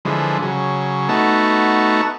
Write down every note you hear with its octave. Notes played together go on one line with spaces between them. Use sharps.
D3 E3 F3 G#3
C#3 F#3
A3 B3 D#4 F#4 A5